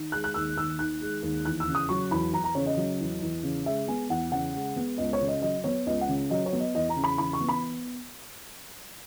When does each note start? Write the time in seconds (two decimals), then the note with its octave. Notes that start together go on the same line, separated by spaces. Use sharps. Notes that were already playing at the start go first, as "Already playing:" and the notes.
Already playing: D#3
0.12 G#3 F#6
0.24 F#6
0.34 D#2 E6
0.57 D#2 E6
0.79 D#3 F#6
1.01 G#3
1.23 D#2
1.45 E2 F#6
1.60 E6
1.68 C#3
1.75 D#6
1.89 F#3 C#6
2.11 E2 B5
2.33 E2 A#5
2.44 A#5
2.55 C#3 C#5
2.66 D#5
2.77 F#3
3.00 E2
3.21 E2
3.43 C#3
3.66 G#3 E5
3.88 B3 G#5
4.09 E2 F#5
4.32 C#3 F#5
4.54 G#3
4.76 B3
4.98 C#2 D#5
5.13 C#5
5.21 C#3
5.28 D#5
5.42 F#3 D#5
5.64 B3 C#5
5.87 C#2 D#5
6.01 F#5
6.09 C#3
6.30 F#3 D#5
6.46 C#5
6.53 B3
6.60 D#5
6.75 E2 D#5
6.89 A#5
6.96 C#3
7.04 B5
7.18 E3 B5
7.33 C#6
7.41 B3
7.49 B5